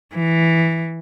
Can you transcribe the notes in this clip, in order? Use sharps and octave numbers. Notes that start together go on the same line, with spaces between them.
E3